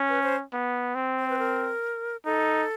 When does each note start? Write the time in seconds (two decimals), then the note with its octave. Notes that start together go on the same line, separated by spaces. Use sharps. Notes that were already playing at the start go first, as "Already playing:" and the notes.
Already playing: C#4
0.09 B4
0.23 C5
0.52 B3
0.95 C4
1.19 C5
1.30 B4
1.39 A#4
2.25 D#4 A4